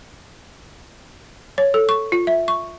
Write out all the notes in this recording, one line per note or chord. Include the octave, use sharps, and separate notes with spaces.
C#5
A4
C#6
F4
E5
C#6